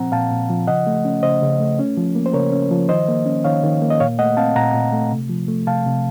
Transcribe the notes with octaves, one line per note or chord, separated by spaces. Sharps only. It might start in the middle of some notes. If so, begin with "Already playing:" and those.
Already playing: A#2 F3 C4 F#5 A#5
A#2 F5 A5
A#2
F3
C#3 D#5 F#5
A3
C#4
C#3 C5 D#5
C#3
A3
C#4
F3
A#3
C5
C#3 A#4 C#5
C#4
F3
D#3 C5 D#5
A#3
C#4
D#3 C#5 F5
D#3
A#3
D#5
A#2 C#5 F5
A3 D#5 F#5
C4 F5 A5
A#2 F#5 A#5
A#2
A3
C3
F3
A3
C3 F5 A5
C3